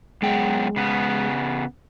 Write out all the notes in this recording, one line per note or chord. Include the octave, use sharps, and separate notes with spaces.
F#2 G#3 B3 G5
C#3 B3